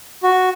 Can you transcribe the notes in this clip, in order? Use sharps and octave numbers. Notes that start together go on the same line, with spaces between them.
F#4